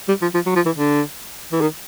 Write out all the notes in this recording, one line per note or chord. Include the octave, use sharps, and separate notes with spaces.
G3
F3
F3
F#3
F3
E3
D3
E3
D#3